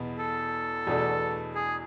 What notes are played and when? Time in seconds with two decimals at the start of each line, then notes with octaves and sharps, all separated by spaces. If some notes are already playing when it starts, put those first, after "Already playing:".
Already playing: E2 B2
0.19 A4
0.87 E2 B2 A3 D4 F#4
1.55 G#4